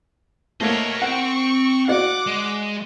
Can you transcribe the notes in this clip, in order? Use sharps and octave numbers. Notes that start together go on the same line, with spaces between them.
A3 A#3 A#4 C#5 D#5 F#5
C4 F#5 G5 C#6
F#4 D5 F5 F#5 D6
G#3